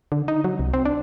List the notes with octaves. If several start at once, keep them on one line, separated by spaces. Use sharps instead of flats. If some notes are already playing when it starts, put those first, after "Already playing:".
D3
D#4
F#3
C2
C4
D4